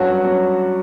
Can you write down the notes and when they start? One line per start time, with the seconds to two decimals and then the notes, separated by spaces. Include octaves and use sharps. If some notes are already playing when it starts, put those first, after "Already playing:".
Already playing: G2 F#3 C#4 F#4
0.24 F#3 C#4